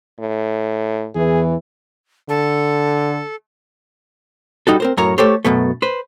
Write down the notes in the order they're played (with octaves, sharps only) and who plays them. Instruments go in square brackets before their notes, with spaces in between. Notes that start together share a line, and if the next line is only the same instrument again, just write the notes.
[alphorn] A2
[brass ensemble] E2 E3 [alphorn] G#4
[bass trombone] D3 [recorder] A4
[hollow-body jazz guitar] G3 D#4 F#4 A4
C4 A#4 C5
F#2 A2 A#4 C#5 A#5
A3 G4 A4 C5 C#5
F#2 B2 A3
B4 C5